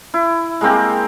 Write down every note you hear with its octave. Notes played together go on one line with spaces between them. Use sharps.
E4
G#3 A#3 C4 G4